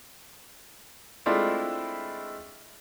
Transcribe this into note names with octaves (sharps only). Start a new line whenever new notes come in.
G#3 A3 C4 D4 E4 F4